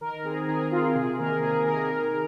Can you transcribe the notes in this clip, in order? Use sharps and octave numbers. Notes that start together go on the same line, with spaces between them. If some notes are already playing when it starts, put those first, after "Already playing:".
D#3 A#4
C4 G#4
D#3 G#4
C4 F4
C3 G#4
D#3 A#3 A#4
C3 G#4
D#3 A#3 A#4
D#3